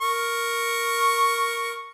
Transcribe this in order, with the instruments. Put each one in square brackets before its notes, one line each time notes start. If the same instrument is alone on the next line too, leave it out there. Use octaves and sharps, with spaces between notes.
[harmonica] A#4 C#6